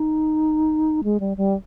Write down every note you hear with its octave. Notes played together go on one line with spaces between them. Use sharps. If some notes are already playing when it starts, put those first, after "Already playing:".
Already playing: D#4
G#3
G3
G3